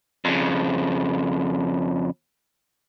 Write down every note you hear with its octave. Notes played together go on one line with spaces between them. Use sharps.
F2 C#3